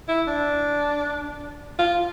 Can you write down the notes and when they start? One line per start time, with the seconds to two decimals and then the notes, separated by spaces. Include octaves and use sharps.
0.08 E4
0.28 D4
1.79 F4